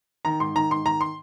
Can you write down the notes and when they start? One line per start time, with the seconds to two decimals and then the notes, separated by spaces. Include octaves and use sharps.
0.25 D#3 A#5
0.40 G#2 C6
0.56 D#3 A#5
0.70 G#2 C6
0.86 D#3 A#5
1.01 C6